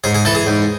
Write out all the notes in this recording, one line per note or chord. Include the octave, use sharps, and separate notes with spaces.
G#2 G#4
G#4
E3 A4
G#4
G#2